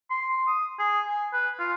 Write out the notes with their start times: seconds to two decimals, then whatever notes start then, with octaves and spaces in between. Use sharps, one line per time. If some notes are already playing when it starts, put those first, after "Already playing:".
0.10 C6
0.47 D#6
0.79 G#4
1.08 G#5
1.33 B4
1.59 F4